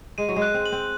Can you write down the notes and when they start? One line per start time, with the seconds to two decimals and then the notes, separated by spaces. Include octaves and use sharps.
0.18 G#3 D#7
0.29 F#3
0.36 G#3
0.42 F#6
0.54 C4
0.66 F#7
0.72 C4